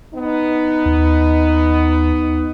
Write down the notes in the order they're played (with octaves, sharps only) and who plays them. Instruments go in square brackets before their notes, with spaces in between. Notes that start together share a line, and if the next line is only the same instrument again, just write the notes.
[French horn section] B3 D#4
[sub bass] D#2